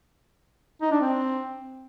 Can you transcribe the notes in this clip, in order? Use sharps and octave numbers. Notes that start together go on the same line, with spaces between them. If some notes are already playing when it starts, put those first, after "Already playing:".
D#4
D4
C4